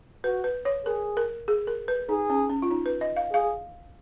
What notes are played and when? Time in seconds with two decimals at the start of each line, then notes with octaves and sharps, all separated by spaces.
0.24 F#4 B4
0.44 B4
0.65 C#5
0.86 G#4 A#4
1.17 A#4
1.48 G#4
1.67 A#4
1.88 B4
2.09 D#4 G#4
2.30 C#4
2.50 C#4
2.62 F4
2.71 D#4
2.86 B4
3.01 D#5
3.16 F5
3.32 G#4 F5